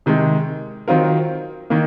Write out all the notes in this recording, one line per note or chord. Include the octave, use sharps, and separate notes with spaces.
C3 D#3 G#3
D#3 F#3 C4 F4 A#4
D#3 A#3